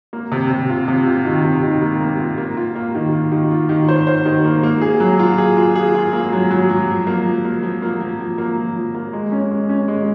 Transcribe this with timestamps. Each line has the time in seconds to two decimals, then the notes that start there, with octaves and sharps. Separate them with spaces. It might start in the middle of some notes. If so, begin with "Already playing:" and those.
0.13 A#3
0.32 C3
0.50 C3
0.69 F4
0.88 C3
1.07 F4
1.25 D#3
1.44 C3
1.63 D#3
1.82 A#3
2.01 A#3
2.20 F4
2.38 A#3
2.57 F4
2.75 A#3
2.95 D#3
3.13 F4
3.32 D#3
3.51 F4
3.69 D#3
3.88 C5
4.07 C5
4.26 D#3
4.45 A#3
4.63 A#3
4.81 G#4
5.00 F#3
5.19 F4
5.38 G#4
5.57 F4
5.75 G#4
5.95 F4
6.13 A#3
6.32 F#3
6.51 F#3
6.69 F#3
6.88 F3
7.07 A#3
7.26 F3
7.45 A#3
7.63 F3
7.82 A#3
8.00 F3
8.19 F3
8.38 A#3
8.57 F3
8.75 F3
8.95 A#3
9.13 G#3
9.32 C#4
9.51 G#3
9.69 C#4
9.88 G#3